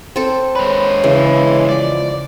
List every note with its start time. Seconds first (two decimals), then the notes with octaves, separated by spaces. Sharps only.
0.16 C4 A4
0.56 G#3 B4 C#5
1.04 C#3 E3
1.69 F3 D5